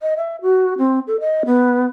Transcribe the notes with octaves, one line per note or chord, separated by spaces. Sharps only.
D#5
E5
F#4
C4
A4
D#5
B3